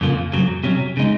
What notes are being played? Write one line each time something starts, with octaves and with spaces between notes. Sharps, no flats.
F2 C#3 F3 A#3
F2 C#3 F#3
C3 F#3 C#4
C#3 G#3 D#4